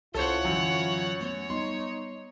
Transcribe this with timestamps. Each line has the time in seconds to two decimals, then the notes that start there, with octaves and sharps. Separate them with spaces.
0.14 C2 C#4 E4 F4 A4 C5 C#5 F#5
0.45 F#2 D3 E3 F#3
1.21 A3 B3 C#5
1.50 G3 B3 D#4 C6